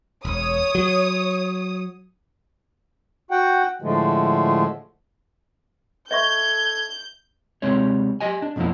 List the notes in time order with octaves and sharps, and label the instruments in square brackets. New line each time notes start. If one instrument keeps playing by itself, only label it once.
[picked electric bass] E1 [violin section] C#5 D#6
[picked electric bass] F#3
[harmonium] F#4 F#5 G5
A2 D3 F3 G#3 A3
[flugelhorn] A4 [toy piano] D#5 E5 C#6 [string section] G6 [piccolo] G#6
[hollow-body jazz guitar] C3 G3 G#3 C4 C#5
G4 D#5 G#5
D4
B1 F2 B2 F3 A#3 E4